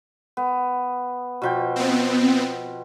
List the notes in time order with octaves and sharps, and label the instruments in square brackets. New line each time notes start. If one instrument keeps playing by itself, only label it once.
[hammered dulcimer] B3
B2 F3 G5
[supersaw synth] B3 C4